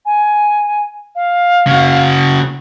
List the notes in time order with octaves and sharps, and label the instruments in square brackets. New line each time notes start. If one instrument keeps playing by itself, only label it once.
[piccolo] G#5
F5
[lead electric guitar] C#3 F#4